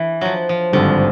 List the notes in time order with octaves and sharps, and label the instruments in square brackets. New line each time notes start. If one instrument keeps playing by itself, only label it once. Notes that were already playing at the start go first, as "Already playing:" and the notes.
Already playing: [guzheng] E3
F3 F#3
F3
[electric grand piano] G#1 G2 D3 G3 [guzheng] F3